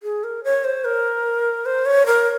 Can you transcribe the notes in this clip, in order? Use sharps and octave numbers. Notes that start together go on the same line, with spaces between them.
G#4
A#4
C#5
C5
A#4
C5
C#5
A#4